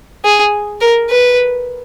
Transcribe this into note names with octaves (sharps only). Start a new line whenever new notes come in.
G#4
A#4
B4